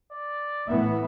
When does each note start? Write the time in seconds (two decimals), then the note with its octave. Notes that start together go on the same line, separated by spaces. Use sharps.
0.11 D5
0.67 A2 E3 B3 E5